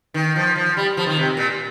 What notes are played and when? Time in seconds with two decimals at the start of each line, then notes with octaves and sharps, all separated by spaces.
0.14 D#3
0.36 F3
0.55 F3
0.77 G3
0.97 F3
1.06 D#3
1.17 C3
1.37 A#2